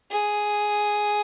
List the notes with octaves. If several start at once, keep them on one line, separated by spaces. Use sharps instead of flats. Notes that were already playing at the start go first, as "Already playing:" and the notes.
G#4